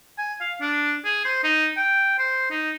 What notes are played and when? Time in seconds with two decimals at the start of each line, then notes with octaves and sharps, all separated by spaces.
0.18 G#5
0.40 F5
0.61 D4
1.04 G#4
1.25 C5
1.44 D#4
1.77 G5
2.19 C5
2.50 D#4